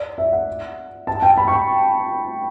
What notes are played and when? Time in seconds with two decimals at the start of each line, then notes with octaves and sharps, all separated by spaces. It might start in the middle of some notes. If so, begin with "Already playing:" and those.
Already playing: D5
0.18 E5
0.32 F#5
1.07 A5
1.22 G5
1.37 B5
1.48 C#6